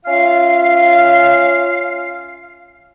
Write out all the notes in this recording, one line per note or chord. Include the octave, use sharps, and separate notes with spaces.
C#4 F4 E5 F5